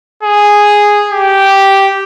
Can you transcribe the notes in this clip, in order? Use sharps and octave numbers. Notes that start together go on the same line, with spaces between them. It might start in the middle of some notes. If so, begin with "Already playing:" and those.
G#4
G4